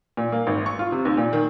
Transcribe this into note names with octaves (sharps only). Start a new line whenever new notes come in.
A#2
A#3
G#1
C#6
F4
C3
D#2
A#2
D#3